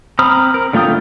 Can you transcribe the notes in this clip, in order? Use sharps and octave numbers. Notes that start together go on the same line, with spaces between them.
C4 A#5 B5 D#6 F6
A#4
D3 A3 F4 G5 D#6